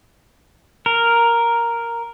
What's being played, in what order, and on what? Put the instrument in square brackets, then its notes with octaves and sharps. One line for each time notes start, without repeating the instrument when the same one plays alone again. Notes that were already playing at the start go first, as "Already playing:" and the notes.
[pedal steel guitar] A#4